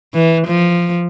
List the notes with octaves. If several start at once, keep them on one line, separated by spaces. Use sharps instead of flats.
E3
F3